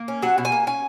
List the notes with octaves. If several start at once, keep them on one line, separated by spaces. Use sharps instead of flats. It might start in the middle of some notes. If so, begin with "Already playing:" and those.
Already playing: A#3
C#4
F#3 F#5
B2
G#5
A#3
C#4 G#5